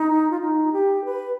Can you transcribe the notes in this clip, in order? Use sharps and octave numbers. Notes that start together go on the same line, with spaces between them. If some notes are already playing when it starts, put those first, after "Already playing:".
Already playing: D#4
F4
D#4
G4
B4